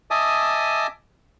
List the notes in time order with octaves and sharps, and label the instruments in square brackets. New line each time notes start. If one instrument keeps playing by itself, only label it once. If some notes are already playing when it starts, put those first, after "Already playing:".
[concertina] D#5 E5 G#5 A5 D6 D#6